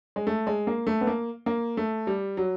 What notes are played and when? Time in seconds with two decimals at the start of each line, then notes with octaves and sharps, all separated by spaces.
0.16 G#3
0.27 A3
0.47 G#3
0.67 A#3
0.87 A3
1.01 B3
1.07 A#3
1.46 A#3
1.77 A3
2.07 G3
2.37 F#3